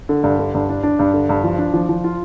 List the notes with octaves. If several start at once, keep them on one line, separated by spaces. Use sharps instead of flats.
D3
G2
D3
G2
D4
D4
G2
D3
G2
F3
D4
F3
F3
F4